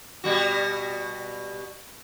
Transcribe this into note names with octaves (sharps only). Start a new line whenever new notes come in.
B2 G3 F#4